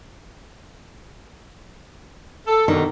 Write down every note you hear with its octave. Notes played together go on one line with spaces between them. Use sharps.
A4
D#2 B2 D3 D#3